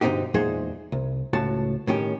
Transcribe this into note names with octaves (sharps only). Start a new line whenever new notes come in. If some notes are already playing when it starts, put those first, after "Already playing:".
G2 B2 D3 C4 D#4 G4
E2 A#2 G#3 D#4 G#4 C5
C2
C#2 A2 F#4 A5
A2 D#3 C#4 G4